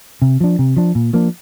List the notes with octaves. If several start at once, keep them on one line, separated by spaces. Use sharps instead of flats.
C3
F3 D4
C3
F3 D4
A#2
F3 A#3 D4